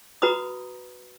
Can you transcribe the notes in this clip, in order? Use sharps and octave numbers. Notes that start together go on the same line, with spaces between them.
F#4 B4 A#5 B5 D#6